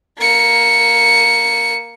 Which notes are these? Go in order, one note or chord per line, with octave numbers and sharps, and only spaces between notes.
A#3 C#7